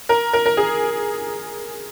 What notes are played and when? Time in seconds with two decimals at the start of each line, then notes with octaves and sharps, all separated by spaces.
0.09 A#4
0.33 A#4
0.46 A#4
0.57 G#4